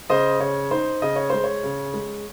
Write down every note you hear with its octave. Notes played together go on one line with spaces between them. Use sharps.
C#3 C5 D#5
C#3 C#5
D#4 C5
C#3 D#5
C#5
G#3 C5
C#5
C#3
G#3